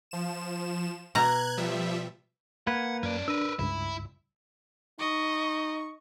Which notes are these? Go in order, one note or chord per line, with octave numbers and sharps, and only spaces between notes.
F3 E7
B2 A#5 F#6 G#6
F3 G3 E5
A#3 B4 F#5 G#6
F#2 C#4 D5
D4 A#4 B4 E6
C#2 G2 E4
D#4 D#5 C#6